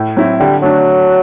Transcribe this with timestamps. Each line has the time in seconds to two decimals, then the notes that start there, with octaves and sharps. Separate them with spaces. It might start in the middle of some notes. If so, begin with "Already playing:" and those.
Already playing: A2
0.17 F#3 C4 E4
0.40 D3 G3
0.62 F#3 A3 D4